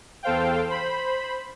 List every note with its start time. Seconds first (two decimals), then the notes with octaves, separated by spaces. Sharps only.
0.23 E2 A4 C5 F5 G5
0.68 C5 B5